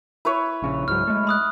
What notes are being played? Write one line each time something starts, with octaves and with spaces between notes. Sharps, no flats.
E4 B4 C#5
A#1 C#3
C#2 G#2 F#3 F6
G#3 A3
B5 D#6 F#6